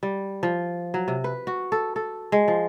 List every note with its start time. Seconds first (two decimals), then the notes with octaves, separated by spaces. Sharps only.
0.03 G3
0.43 F3
0.94 F#3
1.08 C3
1.24 B4
1.47 F#4
1.72 A4
1.96 A4
2.32 G#3
2.48 F3